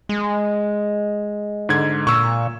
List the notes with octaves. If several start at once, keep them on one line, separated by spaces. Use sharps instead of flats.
G#3
G#2 D3 G#6
A#2 C#6 E6